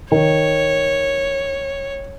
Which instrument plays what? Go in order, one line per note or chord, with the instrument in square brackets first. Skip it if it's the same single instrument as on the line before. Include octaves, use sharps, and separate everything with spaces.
[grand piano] D#3 [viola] C#5